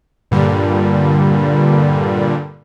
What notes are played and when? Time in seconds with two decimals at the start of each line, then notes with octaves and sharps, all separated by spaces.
0.31 G2 A#2 D3 G3